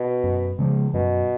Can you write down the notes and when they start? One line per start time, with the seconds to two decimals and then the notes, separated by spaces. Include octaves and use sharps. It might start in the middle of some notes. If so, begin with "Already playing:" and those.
Already playing: B2
0.24 F#2
0.59 C#3 F3 G#3
0.94 F#2 B2